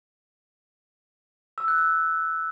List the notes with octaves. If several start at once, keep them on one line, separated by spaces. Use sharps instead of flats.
E6
F#6
E6